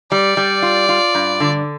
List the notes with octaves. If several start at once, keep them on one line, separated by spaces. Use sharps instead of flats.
G3 D5
G3
F4
F4
G2
D3